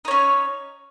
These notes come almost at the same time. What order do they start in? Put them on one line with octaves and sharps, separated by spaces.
D#4 C#5 C#4